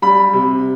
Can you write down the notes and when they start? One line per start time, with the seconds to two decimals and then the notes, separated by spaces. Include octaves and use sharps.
0.02 G3 B5
0.33 C3